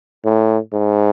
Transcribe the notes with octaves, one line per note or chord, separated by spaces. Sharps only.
A2
G#2